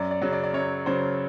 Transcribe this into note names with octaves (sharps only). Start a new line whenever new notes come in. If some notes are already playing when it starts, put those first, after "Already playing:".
Already playing: F#2 D5
D5
C#3 F#3
D5
D5
F#2 C#5
C#3 F#3 C5